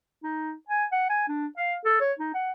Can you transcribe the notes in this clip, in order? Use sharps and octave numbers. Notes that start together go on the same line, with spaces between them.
D#4
G#5
F#5
G#5
D4
F5
A4
C#5
D#4
F#5